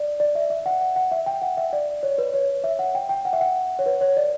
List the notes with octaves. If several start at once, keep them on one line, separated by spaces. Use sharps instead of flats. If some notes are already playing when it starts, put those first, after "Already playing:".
Already playing: D5
D5
E5
E5
F#5
F#5
F#5
E5
G5
F#5
E5
D5
C#5
B4
C#5
E5
F#5
G5
G5
F#5
E5
F#5
C#5
B4
C#5
D5